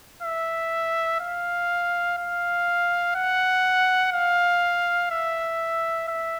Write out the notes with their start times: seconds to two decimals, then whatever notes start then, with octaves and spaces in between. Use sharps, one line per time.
0.23 E5
1.20 F5
2.18 F5
3.16 F#5
4.13 F5
5.11 E5
6.08 E5